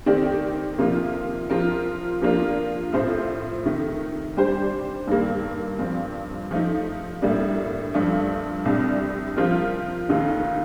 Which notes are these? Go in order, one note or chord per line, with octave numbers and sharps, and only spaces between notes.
D#3 A3 C4 G4 D5
C3 F3 A#3 F4
F3 C4 F4 A#4
F3 A#3 D4 F4 A#4
A2 A3 C4 F4 C5
C3 D#3 A3
G3 D4 G4 C5
G2 D#3 A#3
G2 F3 C4
F3 A3 D#4
A2 G3 A#3 D4
G2 F3 A3 D4 A4
C2 C3 G3 D4
F3 C4 F4 A#4
D#2 D#3 A3 D#4